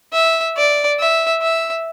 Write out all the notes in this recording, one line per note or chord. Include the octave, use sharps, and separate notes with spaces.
E5
D5
E5
E5